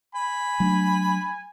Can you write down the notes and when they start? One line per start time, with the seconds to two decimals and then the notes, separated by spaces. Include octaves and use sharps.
0.15 G#5 B5
0.60 F#3 A3 D4